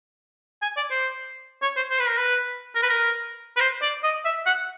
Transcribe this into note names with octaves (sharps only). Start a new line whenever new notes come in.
G#5
D5
C5
C#5
C5
C5
B4
A#4
B4
A#4
B4
A#4
B4
C5
D5
D#5
E5
F#5